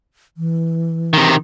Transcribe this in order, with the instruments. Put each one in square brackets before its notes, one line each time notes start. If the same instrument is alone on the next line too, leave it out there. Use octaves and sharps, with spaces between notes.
[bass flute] E3
[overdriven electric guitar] C3 D#3